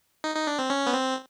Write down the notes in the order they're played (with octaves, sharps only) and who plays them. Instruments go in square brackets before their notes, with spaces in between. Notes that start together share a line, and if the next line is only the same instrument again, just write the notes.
[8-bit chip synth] D#4
D#4
D4
C4
C#4
B3
C4